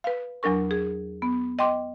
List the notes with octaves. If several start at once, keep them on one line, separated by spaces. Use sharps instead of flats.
B4 F5
E2 F#3 D4 A#4 C#6
G#4
B3
D#5 G5 C6 D6